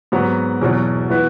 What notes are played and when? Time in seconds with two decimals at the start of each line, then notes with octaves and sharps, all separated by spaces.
0.12 G#2 F#3 B3 F#4
0.61 E2 B2 F#3
1.10 E3 B3 F#4 B4